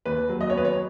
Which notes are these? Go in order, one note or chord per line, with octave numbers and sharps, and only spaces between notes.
D#2 B4
F#3
D#5
C#5
B3 B4
C#5